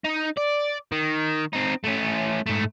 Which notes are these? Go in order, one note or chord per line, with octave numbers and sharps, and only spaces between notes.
D#4
D5
D#3
C4 D#4
A3 C#4
G#2 A3